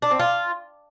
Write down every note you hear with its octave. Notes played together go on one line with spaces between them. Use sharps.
D4
C4
F4